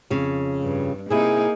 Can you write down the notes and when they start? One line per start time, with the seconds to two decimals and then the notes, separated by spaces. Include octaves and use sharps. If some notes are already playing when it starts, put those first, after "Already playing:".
0.10 F2 C#3
0.62 G2
1.10 C3 A#3 D#4 E4 G#4